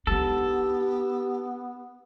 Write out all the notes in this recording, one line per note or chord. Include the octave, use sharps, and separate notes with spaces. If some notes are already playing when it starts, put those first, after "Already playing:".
B3 D4 D#4 G4 A4